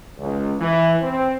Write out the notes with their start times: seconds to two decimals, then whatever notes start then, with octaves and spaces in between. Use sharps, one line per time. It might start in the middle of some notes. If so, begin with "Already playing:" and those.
0.19 C#2
0.60 E3
1.01 C4